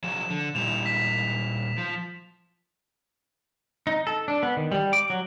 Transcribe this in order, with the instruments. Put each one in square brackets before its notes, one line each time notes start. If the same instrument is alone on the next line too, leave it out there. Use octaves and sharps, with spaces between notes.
[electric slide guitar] F3 F#3 G#4 [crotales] E7
[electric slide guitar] D3
[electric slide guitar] A#2 G3 E4 [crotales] E7 F7
[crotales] B6 E7
[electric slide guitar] F3
[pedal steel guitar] D#4
A4
D4
B3
D#3
G3
D6
F#3